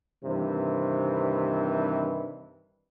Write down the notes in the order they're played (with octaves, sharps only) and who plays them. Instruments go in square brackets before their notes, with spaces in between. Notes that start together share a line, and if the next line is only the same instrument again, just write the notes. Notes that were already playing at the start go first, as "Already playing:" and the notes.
[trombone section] G2 C3 D#3 E3